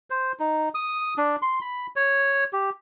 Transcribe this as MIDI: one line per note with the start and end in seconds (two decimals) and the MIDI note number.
0.10 0.32 72
0.40 0.69 63
0.75 1.14 87
1.18 1.36 62
1.42 1.59 84
1.61 1.87 83
1.96 2.44 73
2.53 2.70 67